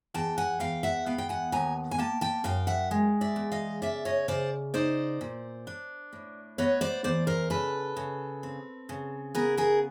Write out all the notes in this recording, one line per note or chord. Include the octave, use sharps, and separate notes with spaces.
E2 G5 A5
F#5 G#5
E2 F5 G5
E5 F#5
B3 F5 G5
G5
F#5 G#5
D#2 G#5 A#5
G#5
A#3 G5 A5
G5 A5
F#2 F5 G5
E5 F#5
G#3
D5 E5
E2
D#5 F5
C#3 D5 E5
C#5 D#5
C#3 C5 D5
D#4 C5 D5
A#2
D4
A2
B3 C#5 D#5
C5 D5
E2 C5 D5
A#4 C5
C#3 A4 B4
C#3
C4
C#3
B3 G#4 A#4
G#4 A#4